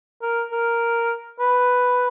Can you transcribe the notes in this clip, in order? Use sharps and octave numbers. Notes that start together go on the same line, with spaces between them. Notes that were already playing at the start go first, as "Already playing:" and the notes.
A#4
A#4
B4